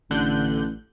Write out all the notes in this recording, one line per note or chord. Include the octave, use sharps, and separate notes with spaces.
A1 D3 F#6 G6